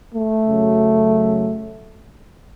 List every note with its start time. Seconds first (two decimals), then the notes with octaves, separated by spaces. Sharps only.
0.12 A3
0.45 F#2 C#3 F#3